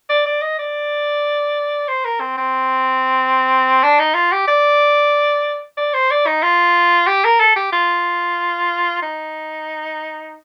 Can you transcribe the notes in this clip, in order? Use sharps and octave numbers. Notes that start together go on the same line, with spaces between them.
D5
D5
D#5
D5
C5
A#4
C4
C4
D4
D#4
F4
G4
D5
D5
C5
D5
D#4
F4
G4
A#4
A4
G4
F4
D#4